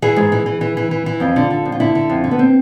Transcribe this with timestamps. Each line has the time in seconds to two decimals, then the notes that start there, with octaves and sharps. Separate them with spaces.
0.02 E3 G#4
0.16 G#2
0.32 E3
0.46 E3
0.61 E3
0.77 E3
0.91 E3
1.06 E3
1.20 F2 F4
1.36 D3
1.50 D3
1.65 F2
1.72 F4
1.80 D3 E4
1.95 D3
2.10 F2
2.24 D3
2.31 B3
2.39 C4